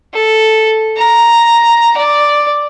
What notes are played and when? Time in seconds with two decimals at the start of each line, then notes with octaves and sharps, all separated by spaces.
0.14 A4
0.97 A#5
1.97 D5